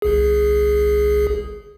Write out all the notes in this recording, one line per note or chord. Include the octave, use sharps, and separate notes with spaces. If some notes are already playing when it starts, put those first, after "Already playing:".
G1 C2 G#4